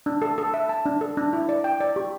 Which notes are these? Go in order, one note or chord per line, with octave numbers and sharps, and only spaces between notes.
D4
A4
A4
E5
A5
D4
A4
D4
E4
D5
G5
D5
G4